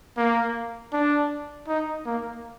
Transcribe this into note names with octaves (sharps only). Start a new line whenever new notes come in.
A#3
D4
D#4
A#3